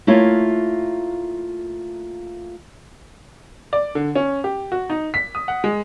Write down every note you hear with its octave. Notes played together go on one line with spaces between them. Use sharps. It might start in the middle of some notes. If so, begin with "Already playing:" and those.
A3 A#3 E4 F4 C#5
D5
D3
C#4
G4
F#4
D#4
B6
D#6
F#5
G#3